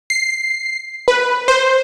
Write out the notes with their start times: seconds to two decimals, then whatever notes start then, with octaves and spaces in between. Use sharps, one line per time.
0.10 C7
1.08 B4
1.48 C5